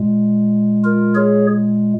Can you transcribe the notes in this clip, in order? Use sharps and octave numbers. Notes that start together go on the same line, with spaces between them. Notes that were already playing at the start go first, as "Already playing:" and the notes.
Already playing: A#2 G#3
F4 A#4
G#4 C#5